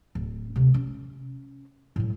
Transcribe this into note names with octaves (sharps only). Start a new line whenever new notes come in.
D1
D2 C3
C#4
A2 G3